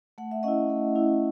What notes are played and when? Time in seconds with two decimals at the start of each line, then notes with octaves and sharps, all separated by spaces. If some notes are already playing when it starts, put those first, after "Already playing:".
0.18 A3 F#5
0.31 E5
0.43 C#4 E4 D#5 F#5
0.69 A3
0.96 C#4 E4